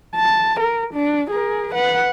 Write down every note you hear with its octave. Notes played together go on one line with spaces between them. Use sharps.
A5
A#4
D4
G#4 A#4
B4 F#5